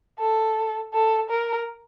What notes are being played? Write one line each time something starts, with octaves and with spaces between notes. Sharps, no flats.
A4
A4
A#4